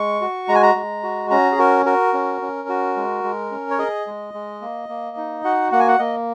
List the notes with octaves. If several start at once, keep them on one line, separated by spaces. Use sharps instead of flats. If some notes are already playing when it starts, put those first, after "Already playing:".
Already playing: G#3 C#6
F#4
G#3 A#5
G#5
A#5
G#3
F#4
C#4 A#5
G#4
F#4 A#4
F#4 A#4
C#4
C#4
F#4
G#3
G#3
C#4
C#5
G#4 D#5
G#3
G#3
A#3
A#3
D#4
F#4 F#5
A#3 F#5
G#5
F#5
A#3 D#5